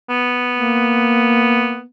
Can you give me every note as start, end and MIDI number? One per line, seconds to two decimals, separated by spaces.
0.09 1.87 59
0.57 1.82 58